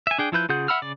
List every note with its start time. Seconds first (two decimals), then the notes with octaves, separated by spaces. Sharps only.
0.07 E5 G#5
0.18 D4 G#4 G5
0.32 F3 E4 B4 G6
0.49 C#3 F4 G#4 F#5 G6
0.68 E5 F#5 B5 E6 F6
0.82 C#3 D5